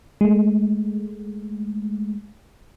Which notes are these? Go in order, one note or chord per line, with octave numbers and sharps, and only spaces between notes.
G#3 A3